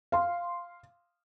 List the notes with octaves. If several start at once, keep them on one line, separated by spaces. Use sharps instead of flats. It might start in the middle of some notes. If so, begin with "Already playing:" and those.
F5 C6